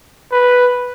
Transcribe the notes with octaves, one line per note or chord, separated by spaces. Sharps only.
B4